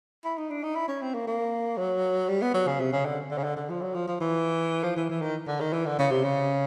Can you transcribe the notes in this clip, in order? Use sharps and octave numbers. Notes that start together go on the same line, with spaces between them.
E4
D#4
D4
D#4
E4
C#4
C4
A#3
A#3
F#3
G3
B3
F#3
C#3
C3
C#3
D3
D3
C#3
D3
D3
F3
F#3
F3
F3
E3
F3
E3
E3
D#3
D3
D#3
E3
D3
C#3
C3
C#3